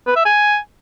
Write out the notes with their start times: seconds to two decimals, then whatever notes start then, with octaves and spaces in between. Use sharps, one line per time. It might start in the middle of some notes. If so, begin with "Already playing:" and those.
0.07 B4
0.16 E5
0.25 G#5